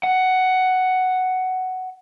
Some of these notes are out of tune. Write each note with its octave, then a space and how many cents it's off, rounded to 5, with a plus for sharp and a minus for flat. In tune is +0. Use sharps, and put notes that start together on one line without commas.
F#5 +10